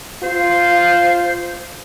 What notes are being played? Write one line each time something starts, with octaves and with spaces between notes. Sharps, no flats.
F4 C5